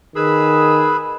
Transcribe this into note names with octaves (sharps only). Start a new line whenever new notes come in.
D#3 G#4 B4 B5 E6